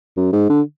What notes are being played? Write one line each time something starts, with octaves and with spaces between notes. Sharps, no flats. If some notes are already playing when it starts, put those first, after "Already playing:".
F#2
G#2
D3